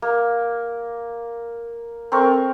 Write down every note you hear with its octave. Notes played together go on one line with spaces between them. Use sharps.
A#3
C4 A4 A#4 C#6